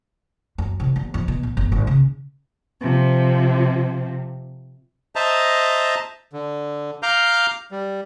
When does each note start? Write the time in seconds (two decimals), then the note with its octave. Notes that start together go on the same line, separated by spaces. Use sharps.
0.58 F#2
0.80 C2
0.96 G1
1.14 F2
1.28 B2
1.43 B1
1.57 G1
1.72 G#1
1.87 C#3
2.79 C3 F3
5.16 C5 D#5 E5 A5 A#5
6.33 D3
7.03 F5 A#5 D6 F6 G6
7.72 G3